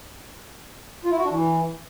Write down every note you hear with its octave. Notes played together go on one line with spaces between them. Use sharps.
F4
E4
F#4
D4
E3